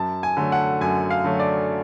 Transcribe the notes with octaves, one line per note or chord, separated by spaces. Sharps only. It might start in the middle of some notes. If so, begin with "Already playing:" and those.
Already playing: F#2 A5
G#5
D3 F#3 A3
F#5
F#2 G#5
F5
D3 F#3 A3
D5